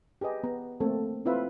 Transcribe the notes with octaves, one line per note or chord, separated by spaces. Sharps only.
G4 G#4 B4 D#5
B3 A#5
A3 A#3 C4 A4
C4 E4 F4 B4 E5